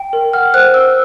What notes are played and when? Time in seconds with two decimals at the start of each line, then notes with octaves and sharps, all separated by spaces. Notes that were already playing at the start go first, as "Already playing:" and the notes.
Already playing: G5
0.13 A#4
0.33 F#5 F6
0.54 C5 F#6
0.74 C5 E6